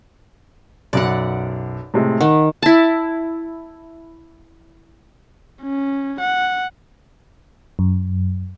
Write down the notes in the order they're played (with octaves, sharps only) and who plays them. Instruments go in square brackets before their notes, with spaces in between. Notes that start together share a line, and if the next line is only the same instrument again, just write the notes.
[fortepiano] B1 F#2 [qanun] D5 F#5
[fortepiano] A2 C3 G#3
[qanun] D#3 [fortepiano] F#5
[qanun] E4 A5
[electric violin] C#4
F#5
[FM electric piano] F#2